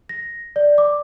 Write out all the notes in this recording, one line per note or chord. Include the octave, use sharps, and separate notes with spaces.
A#6
D5
D6